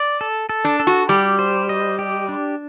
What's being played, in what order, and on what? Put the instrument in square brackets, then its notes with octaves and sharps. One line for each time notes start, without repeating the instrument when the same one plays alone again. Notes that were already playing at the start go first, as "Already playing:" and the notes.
Already playing: [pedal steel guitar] D5
A4
A4
[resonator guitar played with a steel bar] D4
[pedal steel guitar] A4
[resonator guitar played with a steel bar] F#4
[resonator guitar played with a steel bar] G3 [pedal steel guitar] G4
[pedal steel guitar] C5
D#5
G4
D4